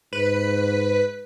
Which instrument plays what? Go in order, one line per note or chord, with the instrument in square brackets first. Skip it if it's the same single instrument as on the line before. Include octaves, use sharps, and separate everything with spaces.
[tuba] G#2 [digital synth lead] B4